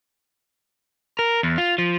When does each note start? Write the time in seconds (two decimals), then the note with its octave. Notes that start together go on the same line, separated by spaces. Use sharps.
1.19 A#4
1.43 E2
1.58 F4
1.78 F3